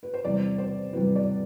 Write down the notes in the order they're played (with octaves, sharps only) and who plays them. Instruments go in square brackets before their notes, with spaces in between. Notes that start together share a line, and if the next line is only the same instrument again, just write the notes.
[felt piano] B4
C5
E2 C3 G3 D5
C5
E2 C3 G3 B4
D5